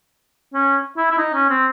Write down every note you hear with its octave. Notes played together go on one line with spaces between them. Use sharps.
C#4
E4
E4
D#4
C#4
C4